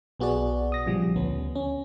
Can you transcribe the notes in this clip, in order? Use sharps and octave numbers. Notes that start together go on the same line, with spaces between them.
B1 B3 F#4 G#4 D5
D#6 A#6
A#1 C#3 F3 G3
D2 B3 C#4
C#4